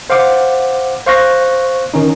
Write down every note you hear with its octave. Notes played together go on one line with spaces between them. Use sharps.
C5 F5 F#5 D6
C5 F5 C#6 F#6 A#6
D#3 C#4 D#4